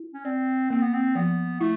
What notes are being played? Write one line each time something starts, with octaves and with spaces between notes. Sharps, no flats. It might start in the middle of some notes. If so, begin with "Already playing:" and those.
Already playing: E4
C#4
C4 D5
A#3 C4
B3
C4
F3 B3
A3 E4